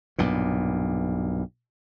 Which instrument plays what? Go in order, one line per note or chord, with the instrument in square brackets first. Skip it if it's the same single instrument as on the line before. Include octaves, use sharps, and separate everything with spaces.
[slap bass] B1 G2 A#2